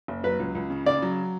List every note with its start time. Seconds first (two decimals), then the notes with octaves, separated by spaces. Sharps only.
0.08 F#1
0.24 F#3 B4
0.40 C#2
0.55 C#2
0.70 C#3
0.86 C#3 D5
1.02 F#3